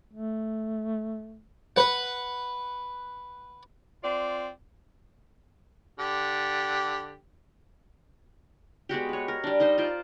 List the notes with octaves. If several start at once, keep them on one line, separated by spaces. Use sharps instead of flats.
A3
B4 F#5
C4 F4 D5
D3 G4
G#3 B3 F#4 G4
B4 C#5
A#4
G3 D4
D#4 C5 D#5
F4 C5 D5